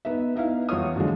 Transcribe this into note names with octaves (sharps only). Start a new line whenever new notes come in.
B3 D#4 E5
B3 D#4 E4 E5 F5
E2 F4 C#5 D#6
A2 D3 E3 F3 G#3